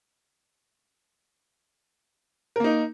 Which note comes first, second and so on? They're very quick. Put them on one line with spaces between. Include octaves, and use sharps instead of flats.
A#4 A#3 D#4